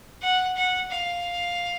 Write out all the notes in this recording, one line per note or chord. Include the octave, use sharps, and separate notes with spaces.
F#5
F#5
F5